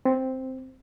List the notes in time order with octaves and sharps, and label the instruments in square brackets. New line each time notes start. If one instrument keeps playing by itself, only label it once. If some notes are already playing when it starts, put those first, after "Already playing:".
[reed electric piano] C4